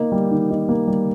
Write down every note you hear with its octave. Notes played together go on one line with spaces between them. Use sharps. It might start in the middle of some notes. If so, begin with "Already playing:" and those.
Already playing: A#3 D#4
G3
D#3
D#4
A#3
G3